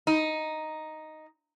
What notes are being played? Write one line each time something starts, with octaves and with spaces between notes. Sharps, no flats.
D#4